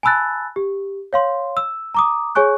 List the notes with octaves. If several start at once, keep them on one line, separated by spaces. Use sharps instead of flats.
G#5 A5 B5 E6 F#6 A6
G4
C#5 F5 C6
E6
A#5 D6 D#6
G#4 C#5 G#5 C#6 F#6